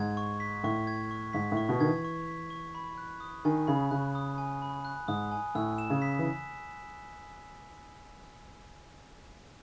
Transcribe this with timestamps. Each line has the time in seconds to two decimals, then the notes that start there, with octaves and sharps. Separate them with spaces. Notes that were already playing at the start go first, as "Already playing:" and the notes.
Already playing: G#2 G#6
0.17 C#6
0.40 B6
0.64 A2 C#6
0.87 G#6
1.11 C#6
1.33 G#2 B6
1.52 A2
1.57 C#6
1.69 B2
1.80 D#3 G#6
1.86 E3
2.04 C#6
2.27 B6
2.50 C#6
2.75 B5
2.98 F#6
3.20 D#6
3.45 D#3 G#5
3.67 C#3 B5
3.91 C#3 F#6
4.15 D#6
4.38 G#5
4.62 B5
4.85 F#6
5.08 G#2 D#6
5.31 G#5
5.55 A2 E6
5.78 E7
5.90 C#3
6.02 B6
6.19 E3